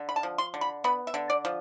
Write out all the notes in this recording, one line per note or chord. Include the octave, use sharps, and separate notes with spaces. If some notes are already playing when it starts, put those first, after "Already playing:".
Already playing: D3
B5
A5
F3
C6
D3
B5
B3 B5
E5
D3
D5
F3